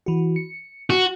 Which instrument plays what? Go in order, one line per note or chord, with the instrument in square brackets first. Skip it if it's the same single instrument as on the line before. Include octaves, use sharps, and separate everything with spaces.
[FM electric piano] E3 F#4
C#7
[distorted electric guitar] F#4